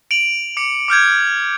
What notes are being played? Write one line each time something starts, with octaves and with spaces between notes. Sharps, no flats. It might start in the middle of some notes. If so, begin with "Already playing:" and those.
D7 F7 F#7
D6 C#7
D6 F6 G6 G#6